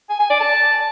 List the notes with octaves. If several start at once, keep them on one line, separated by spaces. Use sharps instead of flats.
G#5
G#5
D5
A5